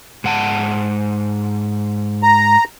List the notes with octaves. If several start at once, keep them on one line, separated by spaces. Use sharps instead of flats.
G#2 F#5 A5
A#5